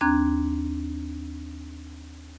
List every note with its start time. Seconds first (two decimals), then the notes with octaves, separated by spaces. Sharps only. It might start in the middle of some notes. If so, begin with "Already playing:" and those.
0.01 D#2 C4 D4 A#5 F#6 G#6